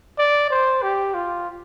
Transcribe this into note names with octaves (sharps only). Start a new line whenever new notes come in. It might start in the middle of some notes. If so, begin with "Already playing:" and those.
D5
C5
G4
F4